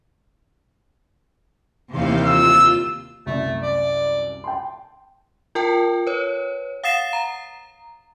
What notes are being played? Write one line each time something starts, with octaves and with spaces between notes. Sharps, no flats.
D#2 C3 E3 F5 G6
F4 E6
C2 F#2 A3
D5
G5 A5 C6
F4 A#4 G5 A5
B4 C#5
F5 F#5 D#6 A6 C7 E7
A#5